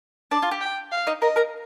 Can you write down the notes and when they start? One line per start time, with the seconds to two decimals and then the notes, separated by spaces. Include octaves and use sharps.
0.31 D4 D5 A5
0.42 F4
0.51 G4
0.61 G5
0.92 F5
1.07 D#4 D#5
1.22 A#4 D#5 A#5
1.36 A#4 A#5